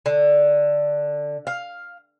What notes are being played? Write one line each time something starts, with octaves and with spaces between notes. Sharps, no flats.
D3
F5